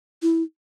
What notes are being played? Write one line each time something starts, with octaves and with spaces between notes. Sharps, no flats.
E4